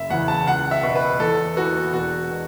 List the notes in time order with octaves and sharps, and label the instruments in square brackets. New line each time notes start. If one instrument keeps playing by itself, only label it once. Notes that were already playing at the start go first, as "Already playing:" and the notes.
Already playing: [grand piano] F#1 E5
E2 C#3 E3 F#5
A5
C#2 F#5
E5
B2 B3
B4
E2 A4
E3 B3 F#4
E1 F#4
B2